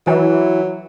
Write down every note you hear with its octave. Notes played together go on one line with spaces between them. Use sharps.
E3 F#3